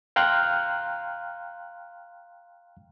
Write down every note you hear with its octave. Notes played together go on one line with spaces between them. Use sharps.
F5 G5 A#5 C6 F6 F#6